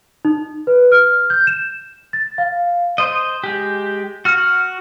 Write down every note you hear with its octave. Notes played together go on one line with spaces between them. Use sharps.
D#4
B4
F6
G6
E7
A6
F5
C5 D#5
G#3 G4
F#4 F6